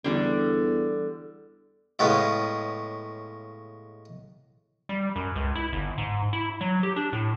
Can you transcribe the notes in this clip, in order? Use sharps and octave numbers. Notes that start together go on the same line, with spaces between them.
E2 D3 G3
A2 C#3 G#3 B3
G3
F#2
C#2
E4
G1
G#2
E4
F#3
G4
D4
A2